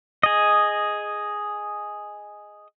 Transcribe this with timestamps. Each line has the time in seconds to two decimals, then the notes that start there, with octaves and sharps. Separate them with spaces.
0.23 G#4 D#5